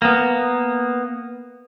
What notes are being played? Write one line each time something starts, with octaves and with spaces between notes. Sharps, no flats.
A#3 B3